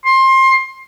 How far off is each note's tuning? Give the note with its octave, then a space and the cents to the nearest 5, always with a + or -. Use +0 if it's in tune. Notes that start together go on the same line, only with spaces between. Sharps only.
C6 +25